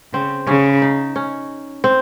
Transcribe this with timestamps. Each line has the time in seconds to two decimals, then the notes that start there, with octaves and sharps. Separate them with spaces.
0.13 C#3 C4
0.47 C#3 C#4
0.82 D#4
1.16 C#4
1.84 C4